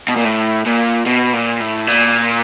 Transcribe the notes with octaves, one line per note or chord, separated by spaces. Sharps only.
B2
A#2
A2
A#2
B2
A#2
A2
A#2